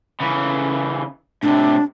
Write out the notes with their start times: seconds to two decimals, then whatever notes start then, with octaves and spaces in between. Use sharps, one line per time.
0.20 C#3 E3
1.43 A2 C3 D4